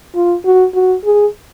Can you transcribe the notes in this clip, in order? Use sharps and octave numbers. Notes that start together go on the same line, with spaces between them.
F4
F#4
F#4
G#4